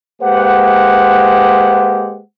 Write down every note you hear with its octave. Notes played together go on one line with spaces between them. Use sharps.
G#3 A#3 G4 B4 C5 F#5